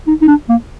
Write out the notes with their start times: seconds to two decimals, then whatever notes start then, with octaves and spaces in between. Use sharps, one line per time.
0.07 D#4
0.22 D#4
0.28 D4
0.49 A#3